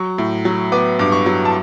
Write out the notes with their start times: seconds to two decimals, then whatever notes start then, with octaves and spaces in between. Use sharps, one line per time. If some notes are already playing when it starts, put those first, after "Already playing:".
Already playing: F#3 C#6
0.18 A2
0.45 F#3
0.72 B3 D6
0.99 G2 D6
1.12 C#6
1.26 F#3
1.45 A5